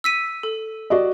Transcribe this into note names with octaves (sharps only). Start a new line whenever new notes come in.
E6 B6 D#7
A4
F#4 D5 D#5